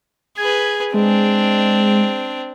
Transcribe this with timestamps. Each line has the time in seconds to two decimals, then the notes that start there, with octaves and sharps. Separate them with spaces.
0.37 G#4 B4 G#6
0.94 G#3 C4 D4